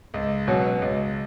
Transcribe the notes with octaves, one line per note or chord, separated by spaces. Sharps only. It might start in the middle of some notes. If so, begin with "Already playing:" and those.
C#2
B2 F#3 C#4 F#4
C#2